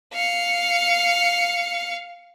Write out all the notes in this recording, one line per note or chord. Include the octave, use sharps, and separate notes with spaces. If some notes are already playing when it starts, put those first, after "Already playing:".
F5 C#7